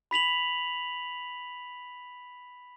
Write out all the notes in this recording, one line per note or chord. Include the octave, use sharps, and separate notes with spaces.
B5 B6 F7 F#7